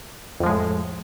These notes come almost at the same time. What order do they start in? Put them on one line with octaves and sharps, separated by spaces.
F2 F3 G#3 A2